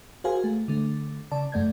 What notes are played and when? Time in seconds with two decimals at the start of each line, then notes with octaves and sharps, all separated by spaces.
0.24 F#4 G#4 A#4 C5 F5 G#5
0.44 A3
0.68 D3 A3
1.31 C#3 D5 A5
1.52 F#2 A3 D5 G6 G#6